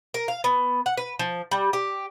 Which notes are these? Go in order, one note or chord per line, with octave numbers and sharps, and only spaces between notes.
A#4
F5
B3
F#5
B4
F3
G3
G4